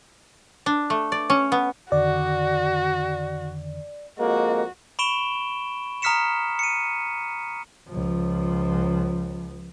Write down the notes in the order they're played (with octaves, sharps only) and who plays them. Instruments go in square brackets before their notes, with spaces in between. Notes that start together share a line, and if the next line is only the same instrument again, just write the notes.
[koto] D4
A3
D5
C#4
B3
[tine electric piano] F2 D3 D#3 [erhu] F#4 [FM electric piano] D5
[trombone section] F2 G#3 A#3 [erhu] F#4
[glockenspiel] B5 C#6 D7 E7 G7
A#5 D#6 F6 B6 C#7 E7
C#7 D#7
[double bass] C#2 F3